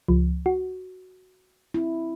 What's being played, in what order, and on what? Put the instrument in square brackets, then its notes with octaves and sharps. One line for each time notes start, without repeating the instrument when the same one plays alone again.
[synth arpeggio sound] C#2 F3
F#4
[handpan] C4 E4